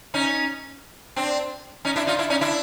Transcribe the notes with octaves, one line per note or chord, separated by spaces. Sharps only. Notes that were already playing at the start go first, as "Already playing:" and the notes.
C#4 D#4
C4 D4
C#4 D#4
D4 E4
D#4 F4
D4 E4
C#4 D#4
D4 E4